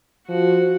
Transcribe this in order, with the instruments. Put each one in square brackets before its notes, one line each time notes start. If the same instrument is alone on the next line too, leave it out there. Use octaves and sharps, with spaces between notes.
[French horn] F3 [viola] F#4